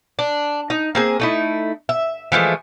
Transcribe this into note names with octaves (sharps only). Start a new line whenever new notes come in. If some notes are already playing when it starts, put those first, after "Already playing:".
D4
D#4
A#3 C4 G#4
A3 D#4 E4
E5
E3 F3 G#3 A3